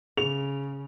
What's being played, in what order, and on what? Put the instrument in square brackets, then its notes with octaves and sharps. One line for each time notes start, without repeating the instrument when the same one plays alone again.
[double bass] C#3 [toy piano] G#4 [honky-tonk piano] F7